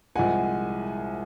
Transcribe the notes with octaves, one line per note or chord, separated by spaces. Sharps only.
C2 A#2 F3 G#3 F#5 G#5